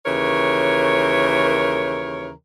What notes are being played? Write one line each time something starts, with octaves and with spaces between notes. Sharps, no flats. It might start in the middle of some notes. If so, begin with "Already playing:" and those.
D#2 C#3 E3 A#4 C#5